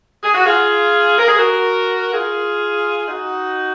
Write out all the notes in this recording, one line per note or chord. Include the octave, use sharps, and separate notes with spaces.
G#4
F#4
F4 G#4
A#4
G#4
F#4 A#4
F4 G#4
D#4 F#4